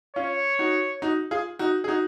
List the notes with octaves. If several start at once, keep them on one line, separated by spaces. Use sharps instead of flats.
C#4 F4 C#5
D#4 F#4
D#4 F#4
F4 G#4
D#4 F#4
G#4
D#4 F#4